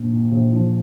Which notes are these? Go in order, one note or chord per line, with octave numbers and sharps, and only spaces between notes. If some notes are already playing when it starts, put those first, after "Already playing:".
Already playing: A#1 A#2
A#2
A#1
F3